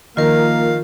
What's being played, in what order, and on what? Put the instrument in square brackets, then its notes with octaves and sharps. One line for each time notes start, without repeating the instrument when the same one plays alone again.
[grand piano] D#3 F3 [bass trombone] A#3 [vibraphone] F4 A#4 [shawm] F5